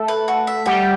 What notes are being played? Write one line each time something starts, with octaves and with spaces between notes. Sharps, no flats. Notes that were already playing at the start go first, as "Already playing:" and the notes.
Already playing: A3 A4
B4
F#4
E5
G3 F#4 G4